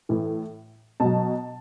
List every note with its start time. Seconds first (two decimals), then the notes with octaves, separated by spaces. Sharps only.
0.09 A2 E3
1.00 B2 F#3 A5